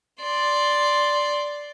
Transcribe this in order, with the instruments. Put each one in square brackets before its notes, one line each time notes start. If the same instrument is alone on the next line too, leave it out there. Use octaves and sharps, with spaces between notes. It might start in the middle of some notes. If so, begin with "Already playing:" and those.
[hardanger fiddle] D5 C6